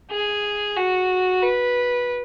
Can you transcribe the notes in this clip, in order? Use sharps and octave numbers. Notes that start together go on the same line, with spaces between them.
G#4
F#4
B4